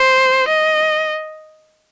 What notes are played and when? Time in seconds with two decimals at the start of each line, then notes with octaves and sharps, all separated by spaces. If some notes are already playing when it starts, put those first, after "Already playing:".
Already playing: C5
0.49 D#5